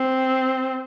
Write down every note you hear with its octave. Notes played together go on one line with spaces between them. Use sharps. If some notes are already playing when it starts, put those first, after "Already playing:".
Already playing: C4